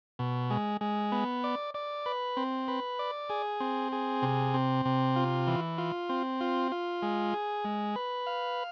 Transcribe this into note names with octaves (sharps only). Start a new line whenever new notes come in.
B2
G#3
G#3
B3
D5
D5
B4
C4
B4
D5
G#4
C4
G#4
C3
C4
C3
F4
E3
F4
C4
F4
F4
G#3
G#4
G#3
B4
F5